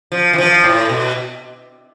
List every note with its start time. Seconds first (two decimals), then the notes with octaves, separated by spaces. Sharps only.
0.12 F3
0.33 E3
0.38 F3
0.64 A2
0.90 B2